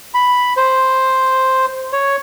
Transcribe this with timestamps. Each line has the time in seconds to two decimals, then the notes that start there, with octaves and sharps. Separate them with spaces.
0.14 B5
0.57 C5
1.93 C#5